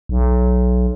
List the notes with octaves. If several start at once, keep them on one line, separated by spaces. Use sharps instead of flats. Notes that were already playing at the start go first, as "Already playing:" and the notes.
B1